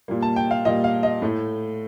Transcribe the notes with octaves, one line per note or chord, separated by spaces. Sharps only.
A#2 G3 A#3
A5
G5
F5
A#2 G3 A#3 D#5
F5
D#5
A2 A3